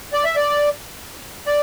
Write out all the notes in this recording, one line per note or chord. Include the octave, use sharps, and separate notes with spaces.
D5
E5
D5
D5